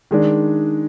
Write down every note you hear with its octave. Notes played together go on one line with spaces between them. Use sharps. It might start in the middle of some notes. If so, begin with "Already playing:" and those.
D#3 G#3 D4